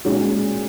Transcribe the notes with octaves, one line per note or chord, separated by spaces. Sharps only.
A#2 G#3 C#4 F#4